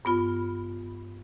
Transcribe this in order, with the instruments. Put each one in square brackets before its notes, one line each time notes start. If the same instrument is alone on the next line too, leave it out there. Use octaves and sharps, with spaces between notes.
[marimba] G2 B3 F4